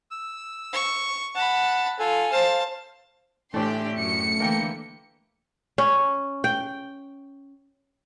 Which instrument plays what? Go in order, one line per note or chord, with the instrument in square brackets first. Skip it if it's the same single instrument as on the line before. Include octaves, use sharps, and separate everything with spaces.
[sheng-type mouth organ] E6
[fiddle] C#6
[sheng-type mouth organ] F#5 [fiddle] A5 B5
[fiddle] F4 [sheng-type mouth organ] A4 G#5
[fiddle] C5 A5 [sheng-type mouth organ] F5
[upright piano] A2 E3 [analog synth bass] A3 [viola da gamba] D4 G4 [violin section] D5 G5 C6
[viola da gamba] F#2 [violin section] C#7
[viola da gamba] D3 E3 [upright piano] A#3 G5
[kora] C#4
G5